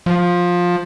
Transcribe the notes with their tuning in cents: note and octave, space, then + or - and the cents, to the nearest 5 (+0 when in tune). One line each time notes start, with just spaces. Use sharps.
F3 +15